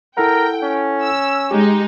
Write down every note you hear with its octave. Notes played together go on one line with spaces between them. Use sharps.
E4 A4 A#4 F#5 G5
C#4
E6
G#3 D#4 G4